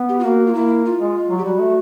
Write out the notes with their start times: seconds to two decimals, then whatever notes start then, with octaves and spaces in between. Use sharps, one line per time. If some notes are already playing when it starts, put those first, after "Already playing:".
Already playing: B3
0.09 G4
0.19 F4
0.23 A#3 F#4
0.47 F4
0.54 A#3 E4
0.85 F4
1.00 G#3
1.30 F#3
1.38 G4
1.45 G3 F#4
1.60 A3